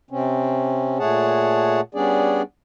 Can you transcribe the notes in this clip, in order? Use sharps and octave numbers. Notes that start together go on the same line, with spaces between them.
C3 C4 C#4
A#2 A3 G#4 C#5 F#5 A5
G3 B3 C#4 D4 G#4 D5